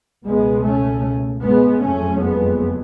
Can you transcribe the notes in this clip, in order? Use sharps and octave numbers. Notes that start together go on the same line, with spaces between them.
C#2 B2 G#3 B3
A3 C#4
G#3 B3
F#1 F2 C#3 A3 C#4
G#3 B3